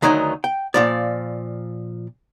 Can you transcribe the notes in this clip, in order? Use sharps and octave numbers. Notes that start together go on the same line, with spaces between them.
D2 D#3 F#3 D#4 G#5
G5
A#2 F3 D5